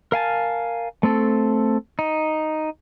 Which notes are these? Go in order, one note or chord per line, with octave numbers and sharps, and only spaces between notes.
A#4 F5 G#5 A5
A3 C4 A4
D#4